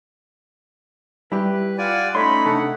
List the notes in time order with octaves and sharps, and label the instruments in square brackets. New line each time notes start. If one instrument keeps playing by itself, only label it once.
[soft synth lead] G3 [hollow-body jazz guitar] E4 G4 [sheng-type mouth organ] B4
[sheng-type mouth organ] F4 D5 G#5 [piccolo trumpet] F#5
[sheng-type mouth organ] A3 D#4 C#5 [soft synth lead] C#4 [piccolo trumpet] B5 [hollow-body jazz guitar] C6
[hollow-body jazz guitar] C3 D4 [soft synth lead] A4 [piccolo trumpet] F#5